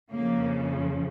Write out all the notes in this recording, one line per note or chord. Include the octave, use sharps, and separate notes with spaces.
F2 C#3 F3 A#3